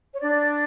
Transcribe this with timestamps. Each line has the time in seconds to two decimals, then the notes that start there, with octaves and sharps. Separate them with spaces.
0.13 C#5
0.20 D4 D5